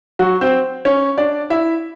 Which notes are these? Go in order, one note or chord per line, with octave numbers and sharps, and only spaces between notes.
F#3 F#4
C4 C5
C#4 C#5
D4 D5
E4 E5